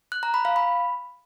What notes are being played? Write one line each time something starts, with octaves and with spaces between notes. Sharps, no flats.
F#6
A#5
B5
F5
B5